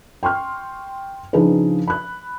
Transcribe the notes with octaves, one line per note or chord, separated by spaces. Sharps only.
G5 C6 C#6 F6
C#3 F3 D4 D#4 G#4 B4
B5 F#6